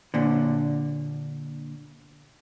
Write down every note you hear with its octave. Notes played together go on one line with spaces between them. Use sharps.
A#2 D3